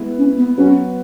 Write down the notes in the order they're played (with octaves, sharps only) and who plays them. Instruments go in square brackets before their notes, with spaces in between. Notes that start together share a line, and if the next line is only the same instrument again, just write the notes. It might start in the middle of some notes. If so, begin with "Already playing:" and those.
Already playing: [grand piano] G#3 B3 E4 B4
[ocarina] C#4
B3
[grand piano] F#3 B3 F#4 B4 [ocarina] C#4